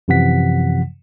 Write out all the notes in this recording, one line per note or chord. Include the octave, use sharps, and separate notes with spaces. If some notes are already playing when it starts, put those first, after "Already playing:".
F#2 C3 E3 F3 F#5 B6